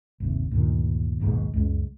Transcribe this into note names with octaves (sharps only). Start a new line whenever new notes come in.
G1 D#2 C3
D2 G2 A#2 D#3
A#1 D#2 G#2 B2
C#2 F#2 G#3